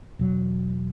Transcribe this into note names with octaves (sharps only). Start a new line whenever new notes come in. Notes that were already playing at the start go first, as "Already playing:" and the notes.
E1 F#3